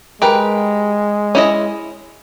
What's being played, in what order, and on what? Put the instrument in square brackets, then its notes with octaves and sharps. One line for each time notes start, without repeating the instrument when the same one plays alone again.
[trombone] G#3 [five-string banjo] G4 A#4 B4
[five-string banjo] C#4 E4 D#5